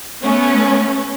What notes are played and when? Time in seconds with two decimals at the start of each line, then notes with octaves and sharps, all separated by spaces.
0.22 A3 B3 C#4